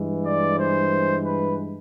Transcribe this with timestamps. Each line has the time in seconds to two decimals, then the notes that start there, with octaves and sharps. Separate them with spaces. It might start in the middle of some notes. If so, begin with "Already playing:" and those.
Already playing: G2 E3 G#3
0.25 D5
0.59 C5
1.25 B4